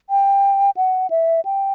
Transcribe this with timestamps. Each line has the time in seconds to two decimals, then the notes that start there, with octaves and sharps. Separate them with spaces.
0.10 G5
0.77 F#5
1.10 E5
1.45 G5